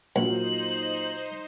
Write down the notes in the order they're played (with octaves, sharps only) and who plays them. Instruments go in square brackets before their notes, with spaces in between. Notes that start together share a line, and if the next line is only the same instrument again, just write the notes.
[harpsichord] A#1 [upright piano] A#2 F#3 A#3 [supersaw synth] D#4 C5 [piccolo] F#7